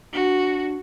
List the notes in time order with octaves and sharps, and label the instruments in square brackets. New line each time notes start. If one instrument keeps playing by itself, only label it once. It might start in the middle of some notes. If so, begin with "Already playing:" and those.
[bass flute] D4 [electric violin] F#4